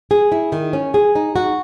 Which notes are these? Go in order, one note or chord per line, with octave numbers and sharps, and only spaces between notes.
G#4
E4
D#3
C#4
G#4
D#4
F#4